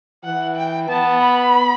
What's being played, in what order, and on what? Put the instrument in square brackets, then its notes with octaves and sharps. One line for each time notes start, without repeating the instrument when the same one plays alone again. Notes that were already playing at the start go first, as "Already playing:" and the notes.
[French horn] E3 [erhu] F#5
[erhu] G5
[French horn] B3 [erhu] A5
[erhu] B5